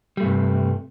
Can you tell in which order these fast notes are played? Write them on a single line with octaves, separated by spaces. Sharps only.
G3 A3 G2 C3